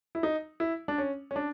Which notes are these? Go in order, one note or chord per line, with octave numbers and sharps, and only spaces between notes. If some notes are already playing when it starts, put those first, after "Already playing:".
E4
D#4
E4
D4
C#4
C#4
D4